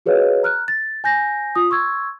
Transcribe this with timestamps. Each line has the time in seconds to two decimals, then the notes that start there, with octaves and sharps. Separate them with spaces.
0.06 F#4 G#4 B4 C#5 D#5 F5
0.43 A#5 F6 F#6
0.68 A6
1.04 G#5 G6 A#6
1.55 F4 D#6
1.70 C6 C#6 E6 G#6